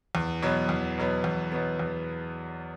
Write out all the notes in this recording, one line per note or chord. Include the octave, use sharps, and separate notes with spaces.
E2
B2 F#3 B3
E2
B2 F#3 B3
E2
B2 F#3 B3
E2